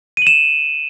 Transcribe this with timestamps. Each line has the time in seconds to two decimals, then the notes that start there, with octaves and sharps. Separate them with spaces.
0.17 D#7
0.22 F#7
0.27 E7